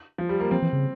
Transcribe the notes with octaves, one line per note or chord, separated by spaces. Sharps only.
F3
G3
A#3
F3 C4
E3
C#3